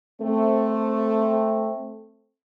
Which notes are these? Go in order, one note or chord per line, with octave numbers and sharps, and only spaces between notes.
A3 C4